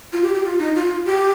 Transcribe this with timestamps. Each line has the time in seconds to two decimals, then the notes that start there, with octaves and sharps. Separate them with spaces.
0.13 F4
0.23 G4
0.34 G4
0.44 F4
0.59 D#4
0.75 F4
1.06 G4